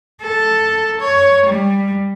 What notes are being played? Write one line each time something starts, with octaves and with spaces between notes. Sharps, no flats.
A4
C#5
G3